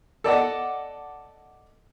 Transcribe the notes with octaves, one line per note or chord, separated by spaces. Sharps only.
A4 D5 D#5 F#5